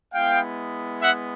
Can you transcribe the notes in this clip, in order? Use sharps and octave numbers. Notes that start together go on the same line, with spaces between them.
G#3 B3 E4 F5 G5
E5 F#5